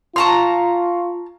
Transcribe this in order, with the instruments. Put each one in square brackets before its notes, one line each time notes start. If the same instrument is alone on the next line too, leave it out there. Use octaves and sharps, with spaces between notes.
[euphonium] F4 [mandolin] A5 A#5 F6 [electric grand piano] C6 C#6